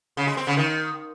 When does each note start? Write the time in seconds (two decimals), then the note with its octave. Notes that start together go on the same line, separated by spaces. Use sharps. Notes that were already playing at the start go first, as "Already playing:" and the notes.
0.17 C#3
0.27 G#3
0.37 C4
0.47 C#3
0.57 D#3